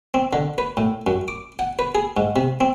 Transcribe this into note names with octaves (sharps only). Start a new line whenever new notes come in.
C4
D3
B4
A2
F#2
D6
F#5
B4
G#4
G#2
C3
C4